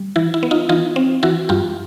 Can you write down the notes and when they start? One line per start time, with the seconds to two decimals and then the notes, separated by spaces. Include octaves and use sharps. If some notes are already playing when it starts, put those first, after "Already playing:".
Already playing: G3
0.16 E3 E4
0.34 E4
0.43 B3
0.51 D#4 F4
0.69 E3 D#4 F4
0.96 C4
1.23 E3 E4 F#4
1.49 G2 F4 G4